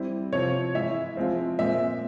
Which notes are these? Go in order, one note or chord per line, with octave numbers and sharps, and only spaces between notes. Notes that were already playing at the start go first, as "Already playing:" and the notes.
Already playing: G3 C4 E4
C3 F3 C4 F4 C#5
E3 G#3 E4 E5
F3 G#3 C4 F4
A#2 G#3 C4 E5